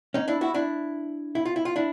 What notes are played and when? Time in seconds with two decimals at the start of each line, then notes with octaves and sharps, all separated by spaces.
0.14 C#4 D#4
0.28 D4 E4
0.41 E4 F#4
0.54 D4 E4
1.35 E4
1.45 F4
1.56 E4
1.65 F4
1.76 D4 E4